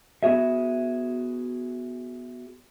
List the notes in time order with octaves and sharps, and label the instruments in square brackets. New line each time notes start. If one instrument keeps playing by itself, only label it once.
[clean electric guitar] B3 F#4 G#4 E5